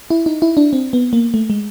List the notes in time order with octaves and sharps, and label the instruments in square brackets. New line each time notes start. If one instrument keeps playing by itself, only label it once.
[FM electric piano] E4
D#4
E4
D4
C4
B3
A#3
A3
G#3